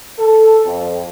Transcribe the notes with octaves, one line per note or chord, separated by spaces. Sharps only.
A4
F2